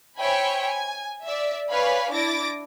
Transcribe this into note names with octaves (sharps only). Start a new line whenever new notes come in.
C5 C#5 E5 G5 G#5 B5
G#5
D5 E5
B4 C#5 D5 F5 G#5 B5
D4 E4 D6 A6 A#6 D7